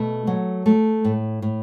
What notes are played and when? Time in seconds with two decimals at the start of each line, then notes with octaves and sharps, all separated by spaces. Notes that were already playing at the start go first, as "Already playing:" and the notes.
Already playing: B2 A3
0.27 F#3
0.66 A3
1.05 A2
1.42 A2